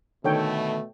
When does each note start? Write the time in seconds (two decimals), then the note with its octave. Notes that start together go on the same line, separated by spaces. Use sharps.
0.24 B2 D3 D#3 A3 A4 C#5 G5